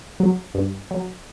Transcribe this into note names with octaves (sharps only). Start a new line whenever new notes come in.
F#3
G2
F#3